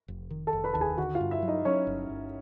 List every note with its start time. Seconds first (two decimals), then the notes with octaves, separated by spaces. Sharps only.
0.08 F1
0.30 D#3
0.47 A4 A5
0.53 F1
0.64 B4 B5
0.73 D#2 A5
0.81 G#4 G#5
0.97 D3 F#4 F#5
1.15 F4 F5
1.21 G2
1.31 E4 E5
1.42 F#3
1.48 D#4 D#5
1.65 F#3 C#4 C#5
1.87 G1
2.10 G1